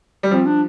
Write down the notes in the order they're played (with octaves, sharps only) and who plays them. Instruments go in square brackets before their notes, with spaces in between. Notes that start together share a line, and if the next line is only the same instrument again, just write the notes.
[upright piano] G3
[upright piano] F3 [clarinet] C4
[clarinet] D4